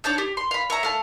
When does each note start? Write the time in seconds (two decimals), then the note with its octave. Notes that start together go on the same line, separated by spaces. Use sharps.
0.04 D4 C#5 A5 G6
0.18 G4
0.37 C6
0.51 F5 B5
0.70 C#5 E5 A#5
0.83 A3 F5 A5